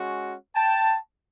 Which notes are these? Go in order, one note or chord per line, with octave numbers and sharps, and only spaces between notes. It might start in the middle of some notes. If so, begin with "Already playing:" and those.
Already playing: G#3 C#4 F#4
G5 A5